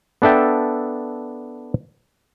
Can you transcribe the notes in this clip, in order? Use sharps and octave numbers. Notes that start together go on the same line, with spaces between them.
B3 D4 A4 E5 G5